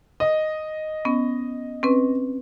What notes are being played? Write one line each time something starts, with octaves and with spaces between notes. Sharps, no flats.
D#5
B3 C#4
C4 C#4 B4